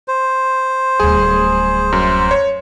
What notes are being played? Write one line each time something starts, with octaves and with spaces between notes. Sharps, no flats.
C5
D1 G3 G#4
F#2
C#5